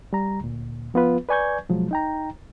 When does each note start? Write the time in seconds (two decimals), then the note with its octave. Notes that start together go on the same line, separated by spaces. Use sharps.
0.13 G3 A#5
0.41 D2 A#2
0.94 F3 B3 F4 B4
1.29 B4 D5 G#5 C#6 G6 G#6
1.69 B2 F3 F#3 G#3
1.91 D#4 G5 A#5